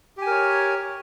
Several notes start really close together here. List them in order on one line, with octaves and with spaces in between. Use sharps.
G4 G#5 A#4 C#5